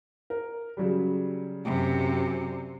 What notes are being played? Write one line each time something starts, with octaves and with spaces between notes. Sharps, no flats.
A#4
C#3 F#3 G3
F#2 C3